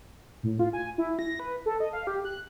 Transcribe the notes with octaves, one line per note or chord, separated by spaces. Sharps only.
A2
F4
G#5
E4
A#6
B4
A4
D#5
F5
G4
F#6